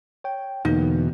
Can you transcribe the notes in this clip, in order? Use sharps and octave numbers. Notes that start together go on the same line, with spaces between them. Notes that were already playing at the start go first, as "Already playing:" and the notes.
C#5 G5
E2 B2 D3 E3 A#3 D#4